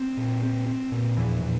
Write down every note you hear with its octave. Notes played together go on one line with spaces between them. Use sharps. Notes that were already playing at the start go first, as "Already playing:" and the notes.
Already playing: C4
A#2
C4
C4
A#2
E2 E3 F3
A#2